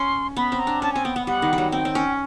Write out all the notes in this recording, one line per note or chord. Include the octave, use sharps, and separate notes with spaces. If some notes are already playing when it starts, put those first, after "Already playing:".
Already playing: C#4 C6
B3 B5
C4
A#5
D4
C#4 A5
C4 G#5
B3 G5
B3 F#5
G3 F#5
D#3
G3
F#3
C4 G5
C4
C#4